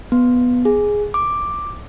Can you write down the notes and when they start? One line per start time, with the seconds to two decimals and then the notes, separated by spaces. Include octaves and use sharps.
0.12 B3
0.65 G#4
1.14 D6